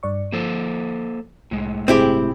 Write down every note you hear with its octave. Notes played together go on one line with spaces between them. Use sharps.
G2 D5 C#6
F3 A#3 A4 C5
C2 A2 G#3
G1 C3 C4 E4 G4 G#4